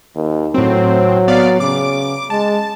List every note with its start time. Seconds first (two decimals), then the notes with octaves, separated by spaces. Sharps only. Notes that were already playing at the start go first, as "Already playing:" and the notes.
0.15 D#2
0.54 A2 F#3 C4
1.28 B3 D5 F5
1.60 C#3 D6
2.30 G#3 A5